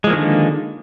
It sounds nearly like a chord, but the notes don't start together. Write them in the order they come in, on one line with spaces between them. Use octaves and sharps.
G#3 F3 A#3 D#3 D3